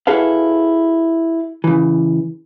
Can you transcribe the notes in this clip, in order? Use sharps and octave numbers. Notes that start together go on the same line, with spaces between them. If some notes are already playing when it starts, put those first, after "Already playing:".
E4 F#4 G#4 A4 B4 F5
C#3 E3